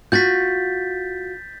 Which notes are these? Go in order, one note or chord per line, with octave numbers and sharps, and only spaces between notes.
F4 F#4 G6 A6 B6